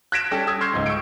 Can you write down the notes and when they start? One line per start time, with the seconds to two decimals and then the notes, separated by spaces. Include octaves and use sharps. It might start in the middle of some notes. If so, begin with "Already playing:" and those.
0.12 F#6 G#6 A#6 B6 D7 E7
0.31 G3 C#4 G4 A4
0.47 D#6 E6 G#6
0.61 C6 C#6 F6 G6 G#6 C7
0.74 C#2 G#2
0.86 C#6 E6 G6 C#7 D7